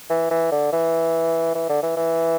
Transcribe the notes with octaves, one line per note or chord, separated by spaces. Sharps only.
E3
E3
D3
E3
E3
D3
E3
E3